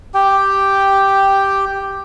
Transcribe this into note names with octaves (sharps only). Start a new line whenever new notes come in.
G4 G5